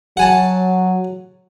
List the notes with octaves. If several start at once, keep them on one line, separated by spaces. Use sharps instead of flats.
F#3 F#5 G#5 A5